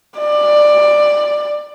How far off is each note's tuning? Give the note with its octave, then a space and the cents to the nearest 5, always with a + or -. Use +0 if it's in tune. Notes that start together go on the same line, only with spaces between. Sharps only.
D5 +15